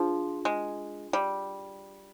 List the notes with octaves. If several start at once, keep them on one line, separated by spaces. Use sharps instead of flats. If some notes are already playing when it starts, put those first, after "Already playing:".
Already playing: F3 D4 F4 G#4
G#3
G3